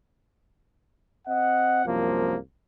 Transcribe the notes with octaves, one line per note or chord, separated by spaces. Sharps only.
C4 D#5 F#5
C2 F#2 F3 A#3